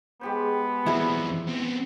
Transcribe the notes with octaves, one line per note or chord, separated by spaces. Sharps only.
G#3 B3 G4 C5
E2 C4 E4 G#4
B3 C4